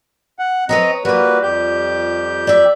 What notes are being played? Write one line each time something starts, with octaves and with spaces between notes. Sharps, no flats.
F#5
C4 B4 C#5 D#5 A#5
G3 A#3 F4 F#4 B4
F2 G4 G6
D5 E5